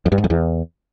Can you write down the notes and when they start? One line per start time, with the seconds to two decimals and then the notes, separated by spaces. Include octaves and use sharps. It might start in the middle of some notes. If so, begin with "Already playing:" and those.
0.06 F2
0.12 G2
0.18 G#2
0.24 F2
0.30 E2